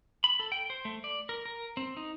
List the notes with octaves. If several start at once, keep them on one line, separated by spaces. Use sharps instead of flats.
B5
A4
G5
C5
A3
D5
A#4
A#4
C4
D#4